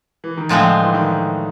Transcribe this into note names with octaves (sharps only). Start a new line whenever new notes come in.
E3
D#3
A2 D3 F3 G#3 C4
E3
D#3